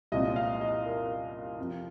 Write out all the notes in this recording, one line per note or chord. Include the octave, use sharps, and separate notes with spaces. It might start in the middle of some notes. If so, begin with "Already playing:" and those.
C2 A#2 G#3 C4 D#5
F5
D#5
A#4
F2 C3 F3